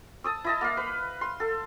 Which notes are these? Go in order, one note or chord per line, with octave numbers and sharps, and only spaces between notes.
A5 D#6 E6
E4 D#5 A5
A#3 F5
B4
C6
A4